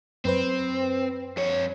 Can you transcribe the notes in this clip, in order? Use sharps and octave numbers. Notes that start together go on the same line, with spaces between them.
F#2 C4 B4 C5
F2 C#5